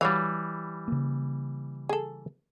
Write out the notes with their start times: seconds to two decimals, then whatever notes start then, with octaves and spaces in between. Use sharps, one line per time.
0.01 E3 F#3 G3 C#5 F5
0.88 C#3 A#3
1.89 G#4 A4